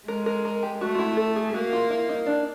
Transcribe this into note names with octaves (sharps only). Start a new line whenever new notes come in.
G#3 A#4
A#4
A#4
G4
A3 F#4
F4
E4
A4
G#4
A#3 F#4
F4
E4
D#4
D4